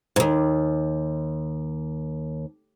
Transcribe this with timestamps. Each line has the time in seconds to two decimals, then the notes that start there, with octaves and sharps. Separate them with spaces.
0.16 D#2 G#2